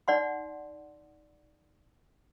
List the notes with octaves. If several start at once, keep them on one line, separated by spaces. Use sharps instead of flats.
D#4 D5 F#5 C6